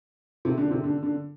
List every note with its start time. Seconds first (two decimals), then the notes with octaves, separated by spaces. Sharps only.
0.45 C3
0.58 D3
0.71 C3
0.84 D3
1.03 D3